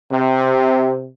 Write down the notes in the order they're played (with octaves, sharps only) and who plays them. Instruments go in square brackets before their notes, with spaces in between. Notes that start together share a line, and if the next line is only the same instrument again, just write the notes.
[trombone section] C3